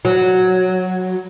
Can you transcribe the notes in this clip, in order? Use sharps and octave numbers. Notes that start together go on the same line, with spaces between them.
F#3